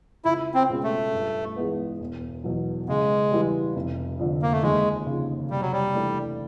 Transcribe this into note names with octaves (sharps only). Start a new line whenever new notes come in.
C#2 E4
C4
B2 G#3 C#4 F4
A3
G2
E3 G#3 B3
E1
E2 B2 F#3
C#3 G#3
E3 G3
F1
F2 D3
A#3
A3
D#2 G#3
C#3 F3
C3 G3
F#3
G3
E3 A3 D4